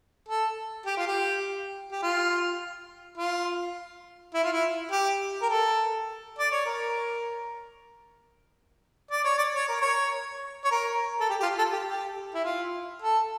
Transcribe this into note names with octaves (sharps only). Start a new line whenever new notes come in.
A4
G4
F4
G4
G4
F4
F4
E4
F4
E4
G4
A#4
A4
D5
C#5
A#4
D5
C#5
D5
C#5
A#4
C#5
C#5
A#4
A4
G4
G4
F4
A4
G4
G4
E4
F4
A4